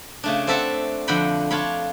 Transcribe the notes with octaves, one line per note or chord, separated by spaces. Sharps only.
C#3 A3 D4
C4 A4 E5 F#5
F2 D3 F#5 G5 B5
D4 F4 C#5 F5 B5